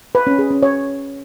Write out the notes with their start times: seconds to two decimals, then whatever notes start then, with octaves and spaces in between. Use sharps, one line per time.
0.15 B4
0.27 C#4
0.39 G#4
0.51 C#4
0.63 C#5